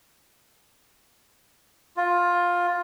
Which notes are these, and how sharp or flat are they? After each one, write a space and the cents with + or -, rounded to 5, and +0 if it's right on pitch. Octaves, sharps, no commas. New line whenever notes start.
F4 +15